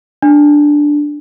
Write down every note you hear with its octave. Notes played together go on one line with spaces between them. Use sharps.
D4